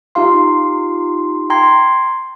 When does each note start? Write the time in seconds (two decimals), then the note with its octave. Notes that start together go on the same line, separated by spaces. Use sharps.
0.15 D#4 F4 G4 F5 C6
1.50 G5 A#5 C6 G#6